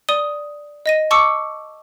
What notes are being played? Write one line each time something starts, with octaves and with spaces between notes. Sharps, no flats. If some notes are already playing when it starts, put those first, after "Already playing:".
D5 D#6 D#7 G7
D#5 A#6 D#7
A5 C#6 D6 E6 C#7